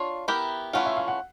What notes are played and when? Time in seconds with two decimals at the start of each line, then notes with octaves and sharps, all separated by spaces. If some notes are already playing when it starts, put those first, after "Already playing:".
Already playing: D4 F4 C#5
0.28 B3 E4 G4 A#4
0.73 E3 A3 C#4 F4 F#5
0.86 E5
0.97 F5
1.08 F#5